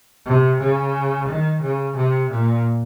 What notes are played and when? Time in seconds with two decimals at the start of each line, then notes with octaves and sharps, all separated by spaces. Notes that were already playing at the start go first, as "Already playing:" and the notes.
0.26 C3
0.60 C#3
1.28 D#3
1.61 C#3
1.96 C3
2.30 A#2